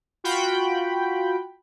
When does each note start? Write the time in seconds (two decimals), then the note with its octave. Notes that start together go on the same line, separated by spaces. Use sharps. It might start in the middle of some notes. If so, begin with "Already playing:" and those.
0.24 F4 F#4 G5 B5